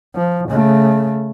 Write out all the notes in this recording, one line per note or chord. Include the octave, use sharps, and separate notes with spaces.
F3
C#3 A3